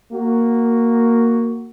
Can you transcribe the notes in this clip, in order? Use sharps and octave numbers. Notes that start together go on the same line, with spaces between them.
A#3 F#4